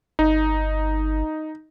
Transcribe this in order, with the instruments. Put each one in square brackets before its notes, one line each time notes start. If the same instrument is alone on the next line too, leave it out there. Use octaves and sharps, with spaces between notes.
[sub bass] G1 [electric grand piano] D#4